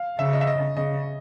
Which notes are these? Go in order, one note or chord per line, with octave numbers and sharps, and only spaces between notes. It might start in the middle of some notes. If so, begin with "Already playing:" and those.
Already playing: F5
C#3 E5
D#5
E5
D#5
C#3 D#5